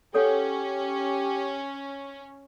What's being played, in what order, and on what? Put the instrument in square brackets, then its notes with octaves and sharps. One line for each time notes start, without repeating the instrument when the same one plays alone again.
[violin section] C#4 [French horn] G4 [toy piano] A4 C#5 F#5